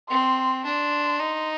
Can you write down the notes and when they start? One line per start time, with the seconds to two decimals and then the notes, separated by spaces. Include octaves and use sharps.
0.10 C4 C6
0.65 D4 C6
1.19 D#4